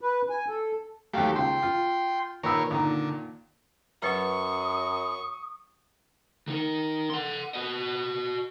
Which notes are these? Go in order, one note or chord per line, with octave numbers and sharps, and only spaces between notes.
B4
G#5
A4
D#2 F#3 A3 G4 F5
C#2 G5 C6
F4
A#2 D#3 A#4 B4 C#5 E6
A#2 D3 D#3 A#5
F#2 F#3 B4 F#5 C#6 D#6
D#3 D#4
F#5 C6
F#4 D#5